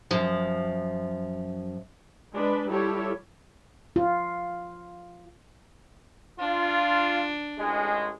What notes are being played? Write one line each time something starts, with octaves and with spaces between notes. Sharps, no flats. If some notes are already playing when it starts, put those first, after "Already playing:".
F#2 F3
G#3 D4 B4
G3 E4 F4 G4 A4 C#5
F4
D4 F4
A1 G#3